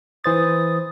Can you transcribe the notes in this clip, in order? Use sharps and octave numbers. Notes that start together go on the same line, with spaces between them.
E3 C5 D#6 A6